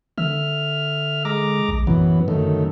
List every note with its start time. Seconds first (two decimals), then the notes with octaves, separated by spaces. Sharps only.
0.18 D3 E5 F6
1.25 G#3 A#5 D6
1.69 A#1
1.87 F#2 A2 E3 B3
2.28 F#2 D3 D#3 A3